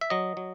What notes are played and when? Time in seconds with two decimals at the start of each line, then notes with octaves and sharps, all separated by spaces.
0.01 E5
0.10 F#3 D#5
0.37 F#3